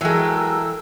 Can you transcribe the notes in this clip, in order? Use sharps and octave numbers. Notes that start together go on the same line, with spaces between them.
E3 F#3 G#3 A4 A#4 G5 G#5 E6